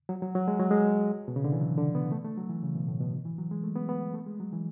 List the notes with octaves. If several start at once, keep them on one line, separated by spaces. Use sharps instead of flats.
F#3
F#3
F#3
G#3
F#3
G#3
B2
C#3
D3
E3
F#3
D3
B3
A3
A3
F#3
E3
C#3
B2
A2
B2
D3
E3
F#3
G#3
A3
B3
B3
A3
G#3
F#3
E3